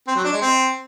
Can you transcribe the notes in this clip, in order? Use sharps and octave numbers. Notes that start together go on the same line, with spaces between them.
C4
F#3
D4
G#3
C4